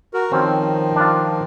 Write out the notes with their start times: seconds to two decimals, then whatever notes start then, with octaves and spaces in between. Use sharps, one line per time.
0.14 F#4 A#4
0.32 D#3 F3 C4 C#4
0.96 D4 F4